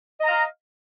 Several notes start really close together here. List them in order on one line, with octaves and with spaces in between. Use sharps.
D#5 A#5 F5